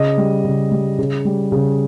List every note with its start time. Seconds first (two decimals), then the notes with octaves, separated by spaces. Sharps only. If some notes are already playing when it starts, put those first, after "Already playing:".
Already playing: C#3 D#5
0.18 G3
0.45 C#3
0.72 G3
0.99 C#3
1.25 G3
1.52 C#3